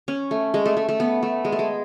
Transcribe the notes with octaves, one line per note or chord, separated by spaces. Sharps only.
C#4
A3
G#3
A3
A3
A3
B3
A3
G#3
A3
G#3